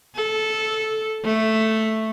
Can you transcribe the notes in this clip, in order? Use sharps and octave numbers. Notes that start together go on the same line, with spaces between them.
A4
A3